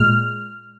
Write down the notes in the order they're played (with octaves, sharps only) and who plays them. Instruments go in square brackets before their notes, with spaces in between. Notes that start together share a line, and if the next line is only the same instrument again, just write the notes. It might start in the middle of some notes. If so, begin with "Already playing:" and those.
Already playing: [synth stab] A#2 G#3 F6